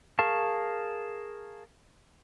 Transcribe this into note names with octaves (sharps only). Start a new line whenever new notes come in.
G#4 A#4 F5 A5 C#6